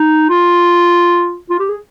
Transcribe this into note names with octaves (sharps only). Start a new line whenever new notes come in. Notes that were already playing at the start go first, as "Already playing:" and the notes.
Already playing: D#4
F4
F4
G4
G#4